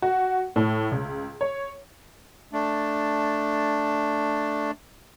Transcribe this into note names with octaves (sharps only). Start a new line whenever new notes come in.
F#4
A2
C#2
C#5
A3 D4